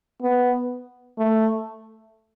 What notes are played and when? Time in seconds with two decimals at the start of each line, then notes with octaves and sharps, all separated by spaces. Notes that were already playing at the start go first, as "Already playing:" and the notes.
0.22 B3
1.18 A3